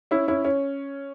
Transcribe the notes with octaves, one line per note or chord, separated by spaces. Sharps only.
C#4 E4
C#4 E4
C#4